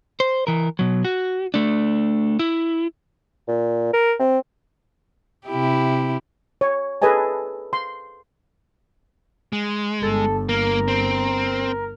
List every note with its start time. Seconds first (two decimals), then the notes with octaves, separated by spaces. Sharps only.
0.20 C5
0.47 E3 A#4
0.79 B2 F#3
1.05 F#4
1.54 A3 D4
2.39 E4
3.48 A#2
3.93 A#4
4.20 C4
5.48 C3 E4 G4
6.61 C#5
7.02 G#4 A4 B4 D#5 G#5 A5
7.73 C6
9.53 G#3
10.02 G1 A4
10.49 A#3 A#4
10.88 C4